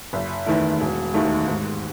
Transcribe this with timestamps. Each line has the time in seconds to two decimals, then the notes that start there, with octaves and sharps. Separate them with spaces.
0.13 F#1
0.46 E2 D#3 A3 E4
0.81 E1
1.14 D#2 D#3 A3
1.48 G#2